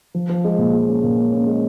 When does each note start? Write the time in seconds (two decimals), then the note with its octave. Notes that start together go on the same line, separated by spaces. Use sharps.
0.14 F3
0.29 F3
0.44 G#3
0.58 A#2
0.73 G#3
0.89 C#4
1.03 A#2
1.17 C#4
1.32 C#4
1.47 G#3